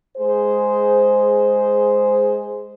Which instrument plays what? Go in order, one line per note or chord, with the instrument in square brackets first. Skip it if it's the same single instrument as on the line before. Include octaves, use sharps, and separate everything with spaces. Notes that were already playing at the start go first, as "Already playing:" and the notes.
[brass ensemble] G#3 G#4 C5